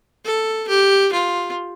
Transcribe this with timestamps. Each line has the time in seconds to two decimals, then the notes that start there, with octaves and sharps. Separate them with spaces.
0.25 A4
0.69 G4
1.12 F4